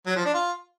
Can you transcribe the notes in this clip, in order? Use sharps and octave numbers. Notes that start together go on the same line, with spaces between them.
F#3
F3
D4
F4